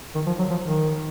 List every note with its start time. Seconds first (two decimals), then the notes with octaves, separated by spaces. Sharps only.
0.15 D#3
0.26 F3
0.39 F#3
0.50 F3
0.62 D#3